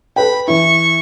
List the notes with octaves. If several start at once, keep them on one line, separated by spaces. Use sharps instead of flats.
A4 B4 G5 B5
E3 E4 C#6